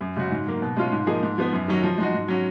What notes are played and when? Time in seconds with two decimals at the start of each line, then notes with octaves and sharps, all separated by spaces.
0.01 F#2
0.16 C#3 G#3 C#4 F#4
0.31 G#2
0.47 F#3 A#3
0.62 B2
0.77 G#3 C#4 F4
0.92 G#2
1.07 F3 A#3 D#4 G#4
1.22 G#2
1.38 F3 B3
1.53 F#2
1.68 D#3 F#3 C#4 F#4
1.83 F3
1.98 G#3 D#4 F#4
2.13 G#2
2.28 F#3 C#4 F#4